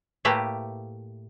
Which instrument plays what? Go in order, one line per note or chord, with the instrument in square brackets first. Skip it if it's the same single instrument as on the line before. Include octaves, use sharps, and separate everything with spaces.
[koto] A2 A3 A#3 G4 B4